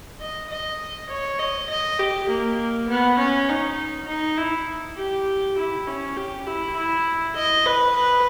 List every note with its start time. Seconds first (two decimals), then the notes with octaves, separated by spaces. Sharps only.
0.20 D#5
0.50 D#5
1.10 C#5
1.39 D#5
1.69 D#5
1.99 G4
2.29 A#3
2.89 B3
3.18 C#4
3.49 D#4
4.08 D#4
4.38 E4
4.97 G4
5.58 E4
5.87 C#4
6.17 G4
6.47 E4
6.77 E4
7.36 D#5
7.66 B4
7.96 B4